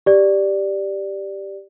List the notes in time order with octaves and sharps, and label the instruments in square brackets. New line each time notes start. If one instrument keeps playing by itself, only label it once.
[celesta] G4 D5